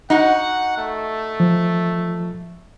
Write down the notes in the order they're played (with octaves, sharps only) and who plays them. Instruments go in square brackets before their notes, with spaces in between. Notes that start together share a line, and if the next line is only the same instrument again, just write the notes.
[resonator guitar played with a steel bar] D#4 F#4 [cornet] F#5
[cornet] A3
[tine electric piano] F3